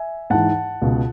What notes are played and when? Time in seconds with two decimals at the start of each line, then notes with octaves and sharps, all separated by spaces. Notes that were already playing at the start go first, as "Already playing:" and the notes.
Already playing: E5 G#5
0.30 G#2 E3 F#5 A5
0.82 C#2 B2